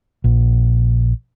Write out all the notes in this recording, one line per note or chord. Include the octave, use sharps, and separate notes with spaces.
A#1